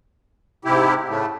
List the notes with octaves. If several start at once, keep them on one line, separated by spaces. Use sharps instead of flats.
G#2 C3 E4 G4
A2 C#3 A3